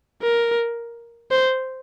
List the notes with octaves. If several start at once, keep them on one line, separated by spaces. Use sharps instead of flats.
A#4
C5